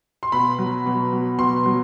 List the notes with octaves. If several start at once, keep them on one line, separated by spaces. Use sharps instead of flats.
C6
B2 B5
F#3
B2
F#3
B2 C6
F#3